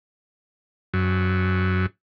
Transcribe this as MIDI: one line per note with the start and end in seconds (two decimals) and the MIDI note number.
0.94 1.86 42